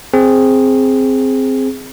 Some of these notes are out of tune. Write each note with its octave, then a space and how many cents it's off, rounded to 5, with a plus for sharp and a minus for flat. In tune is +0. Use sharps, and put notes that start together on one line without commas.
C4 +0 G#4 +0